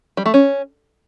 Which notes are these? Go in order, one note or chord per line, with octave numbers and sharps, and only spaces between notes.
G3
A3
C#4